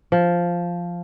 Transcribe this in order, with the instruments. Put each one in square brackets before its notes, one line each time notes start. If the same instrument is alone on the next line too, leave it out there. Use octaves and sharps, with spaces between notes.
[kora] F3